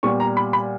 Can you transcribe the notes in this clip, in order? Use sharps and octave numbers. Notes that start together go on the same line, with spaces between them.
A#2 G3 B3 C#6
A#5
B5
B5